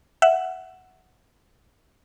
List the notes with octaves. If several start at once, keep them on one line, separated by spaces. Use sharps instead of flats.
E5 F#5